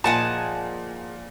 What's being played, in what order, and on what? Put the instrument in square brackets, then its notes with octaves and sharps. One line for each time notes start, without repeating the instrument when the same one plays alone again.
[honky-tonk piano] A#2 [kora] F3 D#5 [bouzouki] G#4 F#5 G#5 [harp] A5